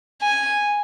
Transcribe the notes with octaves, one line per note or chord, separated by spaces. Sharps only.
G#5